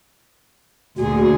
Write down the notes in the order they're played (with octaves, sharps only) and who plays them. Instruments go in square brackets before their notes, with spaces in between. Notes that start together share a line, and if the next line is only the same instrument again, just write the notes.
[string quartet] D2 A#2 G#4 [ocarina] F#4